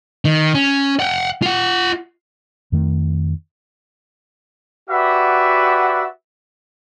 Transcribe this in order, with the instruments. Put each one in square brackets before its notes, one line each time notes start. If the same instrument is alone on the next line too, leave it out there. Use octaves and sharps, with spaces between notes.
[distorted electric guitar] D#3
C#4
F#5 G5
F4 F#5
[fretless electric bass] F2 D#3 A3
[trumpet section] F#4 G4 B4 D5 E5 F#5